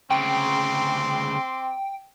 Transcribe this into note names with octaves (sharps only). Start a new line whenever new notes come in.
D2 C#3 C4 G5 C6 D6